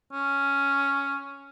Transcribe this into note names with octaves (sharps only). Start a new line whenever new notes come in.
C#4